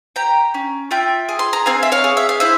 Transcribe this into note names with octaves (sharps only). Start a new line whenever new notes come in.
G4 G5 A#5
C#4
F4 E5 G5
G#4
C6
A#5
C4 F5 G#5
E5
C#5 F5
G#4
E5
F5
E4 C5 E5